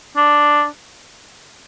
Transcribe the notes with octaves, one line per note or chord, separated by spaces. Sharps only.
D4